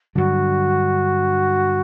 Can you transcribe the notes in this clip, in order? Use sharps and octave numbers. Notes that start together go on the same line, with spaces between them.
G2 D3 F#3 F#4